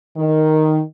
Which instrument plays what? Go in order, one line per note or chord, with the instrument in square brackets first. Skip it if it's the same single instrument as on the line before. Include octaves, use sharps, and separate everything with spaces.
[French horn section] D#3